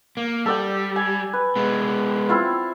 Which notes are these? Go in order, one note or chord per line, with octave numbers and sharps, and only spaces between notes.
A#3
G3 A4 D5 G5
G#5
B4
G#3 B3
C4 E4 F4